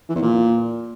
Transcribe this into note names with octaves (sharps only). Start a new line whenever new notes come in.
E3
E2
A#2